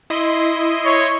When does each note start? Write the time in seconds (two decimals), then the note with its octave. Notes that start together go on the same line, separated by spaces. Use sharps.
0.10 E4 D#5 C6
0.85 C#5